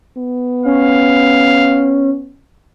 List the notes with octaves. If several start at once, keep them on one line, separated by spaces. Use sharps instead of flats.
B3
C#4 F5